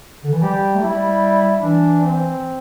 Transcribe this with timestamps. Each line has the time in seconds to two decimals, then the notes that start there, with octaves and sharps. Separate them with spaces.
0.24 D3
0.33 E3
0.42 G3 G4
0.75 A3
0.82 G3 E4
1.61 E3 D4
2.01 C4